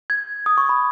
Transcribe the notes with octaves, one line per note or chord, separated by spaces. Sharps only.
G#6
D#6
C#6
B5